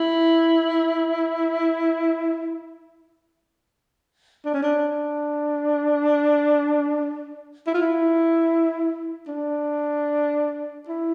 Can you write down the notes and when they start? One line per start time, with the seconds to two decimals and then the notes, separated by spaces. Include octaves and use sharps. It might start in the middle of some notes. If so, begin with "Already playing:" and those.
Already playing: E4
4.45 D4
4.54 C#4
4.63 D4
7.67 E4
7.74 F4
7.82 E4
9.28 D4
10.88 E4